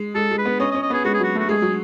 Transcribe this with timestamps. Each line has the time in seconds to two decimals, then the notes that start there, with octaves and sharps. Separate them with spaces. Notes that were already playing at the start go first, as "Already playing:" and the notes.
Already playing: G#3
0.15 G#3 A4
0.31 G#3
0.38 B4
0.45 B3
0.60 C#4 D#5
0.71 D#5
0.75 C#4
0.82 D#5
0.90 B3 G#4
1.04 G#3 F#4
1.14 G#4
1.20 F#3 F#4
1.35 A3 F#4
1.49 G#3 G#4
1.62 F#3